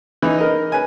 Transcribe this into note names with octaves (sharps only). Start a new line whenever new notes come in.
E3 D#4
A#4 D#5
B4 G#5